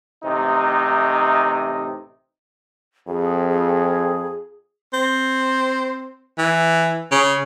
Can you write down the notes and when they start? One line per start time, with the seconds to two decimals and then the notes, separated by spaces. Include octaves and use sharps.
0.24 A1 C3 D#4
3.08 F2 G#4
3.49 G#4
4.93 C4
6.38 E3
7.12 C#3